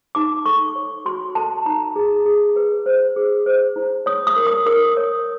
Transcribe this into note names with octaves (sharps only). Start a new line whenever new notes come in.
D#4 D6
A4 C#6
C#5
F#4 C6
A4 A5
D#4 A#5
G#4
G#4
B4
C5
G#4
C5
E4
C#5 D#6
D#6
A#4
D#6
A#4 D#6
C#5